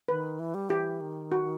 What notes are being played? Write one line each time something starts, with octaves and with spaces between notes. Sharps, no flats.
D#3 B4
E3
G3
E3 G4
D#3
F#4